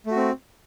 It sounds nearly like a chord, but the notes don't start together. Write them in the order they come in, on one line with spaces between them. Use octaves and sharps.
A3 F#4 C4